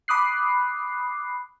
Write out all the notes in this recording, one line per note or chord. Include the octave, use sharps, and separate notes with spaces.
B5 D6 D#6 F#6 C7